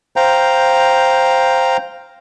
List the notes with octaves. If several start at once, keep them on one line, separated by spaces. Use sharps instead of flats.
C5 F5 G5 A#5